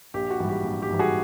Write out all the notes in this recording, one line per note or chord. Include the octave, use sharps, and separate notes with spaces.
A#1 G4
F#4
G#2 E3 G3
G4
A#1
G4
G#2 E3 G3
F#4 G#4